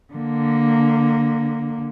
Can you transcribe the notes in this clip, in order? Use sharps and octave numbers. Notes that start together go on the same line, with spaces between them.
D3 A#3